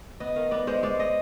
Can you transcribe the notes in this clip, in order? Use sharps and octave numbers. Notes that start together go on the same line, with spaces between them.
B3 D#5
D#3 F5
B3 D5
G#3 C5
G#3 D5
G#3 D#5